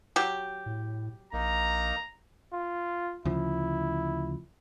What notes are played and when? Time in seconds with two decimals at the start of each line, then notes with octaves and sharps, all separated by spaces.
0.16 F#3 G4
0.66 A2
1.33 A#1 A#3 D#4 A#5
2.52 F4
3.25 D2 C#3 F3 E4